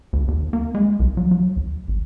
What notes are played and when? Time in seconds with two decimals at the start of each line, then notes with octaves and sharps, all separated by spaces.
0.13 D2
0.28 D#2
0.53 A#3
0.75 G#3
1.00 C2
1.17 F#3
1.31 F#3
1.56 D#2
1.88 G#1